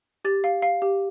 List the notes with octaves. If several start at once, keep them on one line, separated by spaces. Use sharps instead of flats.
G4 A6
F5
F5
G4